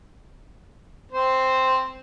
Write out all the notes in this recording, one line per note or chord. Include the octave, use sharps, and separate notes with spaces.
C4 C5